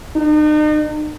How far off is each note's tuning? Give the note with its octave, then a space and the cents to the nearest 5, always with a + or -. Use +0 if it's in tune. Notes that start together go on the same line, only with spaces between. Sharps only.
D#4 -40